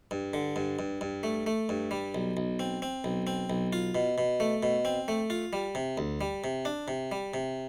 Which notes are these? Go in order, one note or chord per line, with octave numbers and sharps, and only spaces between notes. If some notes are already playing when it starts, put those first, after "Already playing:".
G2
D3
G2
G2
G2
A3
A3
G2
G3
B1
B1
C4
C4
B1
C4
B1
F4
B2
B2
A3
B2
C4
A3
F4
G3
C3
D2
G3
C3
D4
C3
G3
C3